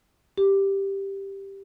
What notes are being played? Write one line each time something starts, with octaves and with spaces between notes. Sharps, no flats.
G4